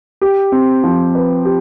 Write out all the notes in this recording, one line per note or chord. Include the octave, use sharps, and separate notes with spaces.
G4
C4
F3
B4
G4